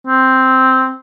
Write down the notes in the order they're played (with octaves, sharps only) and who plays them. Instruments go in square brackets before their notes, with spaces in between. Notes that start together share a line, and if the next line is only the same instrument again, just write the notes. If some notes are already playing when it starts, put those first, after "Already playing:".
[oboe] C4